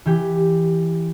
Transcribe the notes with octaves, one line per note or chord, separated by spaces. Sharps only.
E3 G4